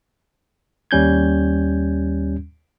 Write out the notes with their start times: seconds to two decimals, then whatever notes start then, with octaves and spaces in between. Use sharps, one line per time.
0.91 D#2 G3 C#4 G6 G#6